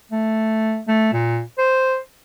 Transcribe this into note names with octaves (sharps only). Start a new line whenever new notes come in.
A3
A3
A#2
C5